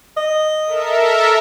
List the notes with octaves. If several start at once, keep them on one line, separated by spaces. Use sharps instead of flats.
D#5
A4 A#4 E5